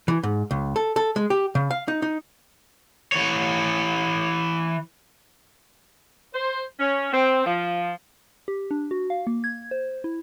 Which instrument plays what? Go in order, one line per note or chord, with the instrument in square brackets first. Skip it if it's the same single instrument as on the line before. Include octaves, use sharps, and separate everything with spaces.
[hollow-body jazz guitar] E3
G#2
C#2
A4
A4
G#3
G4
C#3
F5
D#4
D#4
[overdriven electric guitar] E3 C#5
[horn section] C5
C#4
C4
F3
[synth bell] G4
D4
F#4
F5
A#3
G#6
C5
E4